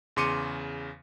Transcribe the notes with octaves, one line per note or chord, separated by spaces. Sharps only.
E2 C#3 C6 D6 C#7 D#7